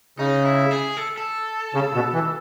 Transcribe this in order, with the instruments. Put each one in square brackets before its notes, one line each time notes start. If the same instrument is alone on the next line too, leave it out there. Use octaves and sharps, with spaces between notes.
[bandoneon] C#3 [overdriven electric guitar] D#4
[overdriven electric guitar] E4
G#4
A4
A4
[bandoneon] C#3
B2
E3